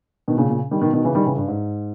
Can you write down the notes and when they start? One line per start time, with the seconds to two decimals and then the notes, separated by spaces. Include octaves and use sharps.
0.28 B2 D#3
0.38 A#2 C#3
0.49 A#2 C#3
0.71 D#3 G3
0.81 B2 D#3
0.93 B2 D#3
1.04 C#3 E3
1.15 D#3 G3
1.26 C#3 E3
1.36 G2
1.48 G#2